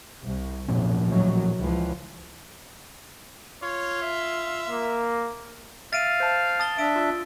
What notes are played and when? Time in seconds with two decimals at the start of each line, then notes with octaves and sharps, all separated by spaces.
0.23 C2
0.68 F1 B1 A#2 F3 C#4
1.06 A2 D#3 F#3
1.58 C#2 E3 F3
3.62 F4 C#5
4.02 E5
4.69 A#3
5.93 E5 F5 A6 D7 D#7
6.20 C5 A5
6.60 A5 D#6 A6 G7
6.78 D4 E5 D#6 D7
6.96 F4 E6